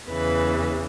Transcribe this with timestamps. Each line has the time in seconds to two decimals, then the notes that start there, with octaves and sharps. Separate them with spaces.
0.09 E2 C#3 E3 B4